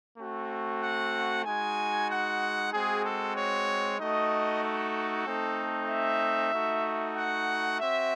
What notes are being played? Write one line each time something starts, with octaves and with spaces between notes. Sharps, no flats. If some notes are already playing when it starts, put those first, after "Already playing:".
A3 C4 F#4
F#5
G#3 D#4 F#4 G#5
F#5
G#3 C4 F#4 G#4
A4
C#5
A3 D#4 F#4 D#5
A4
A3 C4 D#4
E5
A3 D#4 F#4
F#5
C4 F#4 E5